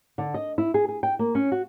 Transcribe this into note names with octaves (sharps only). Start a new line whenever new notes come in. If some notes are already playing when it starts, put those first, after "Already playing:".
D3
D#5
E4
G#4
G#4
G5
A#3
C#4
F#4